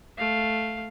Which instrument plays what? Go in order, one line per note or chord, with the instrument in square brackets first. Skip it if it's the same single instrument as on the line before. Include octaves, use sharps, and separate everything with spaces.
[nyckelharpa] A3 F5